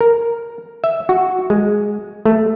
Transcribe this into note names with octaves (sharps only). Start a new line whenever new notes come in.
A#4
E5
F#4
G#3
A3